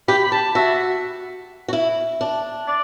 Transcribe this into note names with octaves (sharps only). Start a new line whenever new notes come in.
G4 B5
B5
G4 A5
F#4 E5
F#4
E4
D4
D5